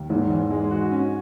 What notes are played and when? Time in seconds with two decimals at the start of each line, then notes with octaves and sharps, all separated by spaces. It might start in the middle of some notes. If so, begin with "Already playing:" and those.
Already playing: D#2
0.10 E2 G#2
0.30 E2
0.51 G#3
0.71 F#4
0.91 C#4